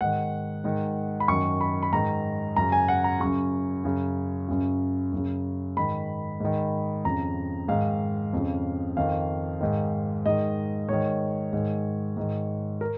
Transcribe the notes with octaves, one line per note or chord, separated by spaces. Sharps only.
G#2 D#3 F#5
G#2 D#3
B5
F#2 D#3 C#6
B5
B5
G#2 D#3 A#5
F#2 C#3 A#5
G#5
F#5
A#5
F#2 C#3 C#6
F#2 C#3
F#2 C#3
F#2 C#3
G#2 D#3 B5
G#2 D#3
F2 C#3 A#5
G#2 D#3 F5
F2 C#3
F2 D#3 F5
G#2 D#3
G#2 D#3 D#5
G#2 D#3 C#5
G#2 D#3
G#2 D#3
A#4